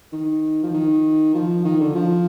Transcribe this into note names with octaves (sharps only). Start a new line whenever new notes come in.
D#3
F3
D#3
F3
D#3
D3
F3